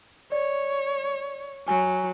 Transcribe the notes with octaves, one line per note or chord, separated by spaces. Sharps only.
C#5 D5
F#3 G#5